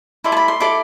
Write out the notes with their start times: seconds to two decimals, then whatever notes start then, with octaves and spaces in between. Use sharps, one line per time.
0.24 E4 A4 D5 C6
0.32 A5
0.37 B5
0.48 C6
0.60 E4 A4 D5 D6